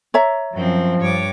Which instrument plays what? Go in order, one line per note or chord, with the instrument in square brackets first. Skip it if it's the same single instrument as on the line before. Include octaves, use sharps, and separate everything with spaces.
[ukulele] C#5 E5 A#5
[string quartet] F#2 C4 [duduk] F3
[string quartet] G2 C#5 D6